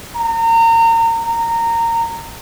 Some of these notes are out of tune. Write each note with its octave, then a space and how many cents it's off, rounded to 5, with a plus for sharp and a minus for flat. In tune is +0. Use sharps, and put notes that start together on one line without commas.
A#5 -30
A#5 -20